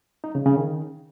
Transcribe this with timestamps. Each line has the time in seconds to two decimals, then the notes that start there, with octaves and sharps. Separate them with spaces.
0.24 D#4
0.35 C#3
0.46 C#3
0.57 D#3